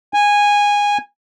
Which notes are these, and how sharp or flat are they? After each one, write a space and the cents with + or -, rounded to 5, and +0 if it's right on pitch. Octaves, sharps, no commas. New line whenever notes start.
G#5 -15